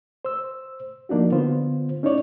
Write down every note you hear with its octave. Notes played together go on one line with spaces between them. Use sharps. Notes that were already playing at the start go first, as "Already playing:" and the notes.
C5 E6
F3 A#3 D4 D#4 F#4
D3 B3 F4 C5
C#4 D#4 E4 C#5 D5